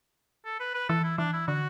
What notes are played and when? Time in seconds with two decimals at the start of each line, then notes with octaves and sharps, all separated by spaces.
0.45 A4
0.60 B4
0.74 B4
0.89 E3 A4
1.04 E4
1.18 E3 D4
1.33 E4
1.48 D3 F#4